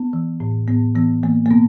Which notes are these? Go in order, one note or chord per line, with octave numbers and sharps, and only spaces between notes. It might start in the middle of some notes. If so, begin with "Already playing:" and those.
Already playing: B3
E3
A2
A2 B3
E3 B3
E3 A#3
A#3
B2 B3